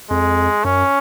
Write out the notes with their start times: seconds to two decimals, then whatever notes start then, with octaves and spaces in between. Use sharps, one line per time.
0.11 F2 G#3
0.64 F#2 C#4